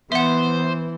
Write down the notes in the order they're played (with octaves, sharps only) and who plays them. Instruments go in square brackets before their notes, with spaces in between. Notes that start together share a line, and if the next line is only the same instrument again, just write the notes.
[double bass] E3 [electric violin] B3 [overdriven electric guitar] C5 [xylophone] E5 F#5